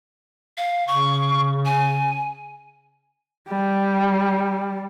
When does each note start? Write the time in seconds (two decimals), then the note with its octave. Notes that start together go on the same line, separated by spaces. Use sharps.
0.58 F5
0.88 C#3 C#6
1.65 G#5
3.49 G3